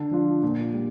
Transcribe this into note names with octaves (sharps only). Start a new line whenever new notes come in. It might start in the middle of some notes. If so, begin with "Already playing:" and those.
Already playing: D3
F3 D4 F4
A#2
G3